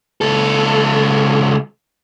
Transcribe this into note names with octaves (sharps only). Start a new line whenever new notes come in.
C#2 A4